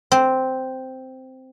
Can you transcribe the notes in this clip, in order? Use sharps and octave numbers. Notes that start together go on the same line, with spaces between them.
C4